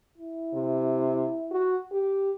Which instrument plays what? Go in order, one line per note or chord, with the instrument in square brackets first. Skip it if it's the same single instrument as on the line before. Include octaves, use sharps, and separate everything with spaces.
[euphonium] E4
[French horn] C3
F#4
G4